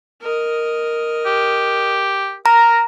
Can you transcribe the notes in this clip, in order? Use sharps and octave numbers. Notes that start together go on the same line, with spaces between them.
A#4 D#5
G4
A#4 A#5